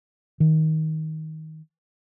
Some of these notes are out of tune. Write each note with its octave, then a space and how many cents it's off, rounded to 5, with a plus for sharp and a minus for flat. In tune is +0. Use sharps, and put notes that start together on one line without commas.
D#3 +20